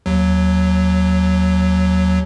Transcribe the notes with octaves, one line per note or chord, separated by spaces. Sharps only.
D#2 F#3